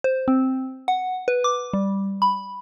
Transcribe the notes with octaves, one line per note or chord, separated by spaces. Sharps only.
C5
C4
F#5
B4
D6
G3
B5